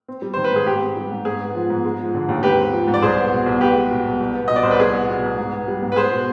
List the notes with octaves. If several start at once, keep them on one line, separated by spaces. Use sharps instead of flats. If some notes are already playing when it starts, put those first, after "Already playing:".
C4
G3
D#3 C5
B4
G#2 G#4
G#2 G4
C4
G3
G#2
G#2 G#4
B3
F3
G#2
G#3
F3
D3
D#2
G#2 G4 B4
C4
F3
G#2
D5
C2 G#4 C5
B3
B2
C2
B3 G4 B4
G#3
B2
C2
C2
B3
B2 D#5
D5
C2 C5
B4
C2 G#4
B3
B2
C2
G#2
B3
G3
G#2
B4
B3 G#4 C5
B2